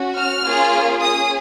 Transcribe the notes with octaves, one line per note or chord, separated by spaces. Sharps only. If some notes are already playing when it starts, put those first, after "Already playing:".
Already playing: C#4 F#4
F6
A#3 C#4 F4 G#4
C#4 G#4 D#6